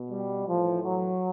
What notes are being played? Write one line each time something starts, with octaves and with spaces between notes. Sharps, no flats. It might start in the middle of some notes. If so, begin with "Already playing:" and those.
Already playing: B2
G3
A2 E3 F3
F#3